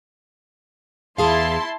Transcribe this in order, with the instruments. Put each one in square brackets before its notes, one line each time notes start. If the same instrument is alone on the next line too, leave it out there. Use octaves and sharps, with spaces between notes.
[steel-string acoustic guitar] E2 G#4 F5 [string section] E4 A5 C6